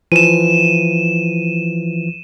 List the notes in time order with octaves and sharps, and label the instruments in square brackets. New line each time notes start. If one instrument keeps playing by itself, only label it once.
[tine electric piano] E3 F3 [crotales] D#7 E7